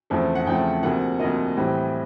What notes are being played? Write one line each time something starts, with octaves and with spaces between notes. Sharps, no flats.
E2 C#3 F3 A3 C4
F#5
E2 C#3 F3 A3 C4 G5
D2 C3 F3 A#3 F#5
D2 C3 F3 A#3 D#5
A2 E3 G3 C4